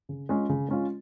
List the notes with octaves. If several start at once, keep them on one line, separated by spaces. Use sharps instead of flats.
C#3
G#3 C#4 F4
C#3
G#3 C#4 F4